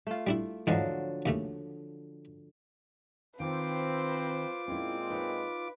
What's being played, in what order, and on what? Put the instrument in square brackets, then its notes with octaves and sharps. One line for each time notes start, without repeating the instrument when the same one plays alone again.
[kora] A3 F4
[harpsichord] G3 D4 E4
[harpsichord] E2 G#2 G#3 [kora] D3 F3 F#3
[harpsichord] D#2 C#3 A3
[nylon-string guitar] D#3 [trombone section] C4 [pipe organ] F4 D6 [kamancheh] B4 C5
[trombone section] A#2 G#3 C4 [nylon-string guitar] C#4 E4
[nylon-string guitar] D#4 C#5 [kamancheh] B4